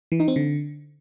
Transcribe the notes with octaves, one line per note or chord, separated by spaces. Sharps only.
E3
D#4
C4
D3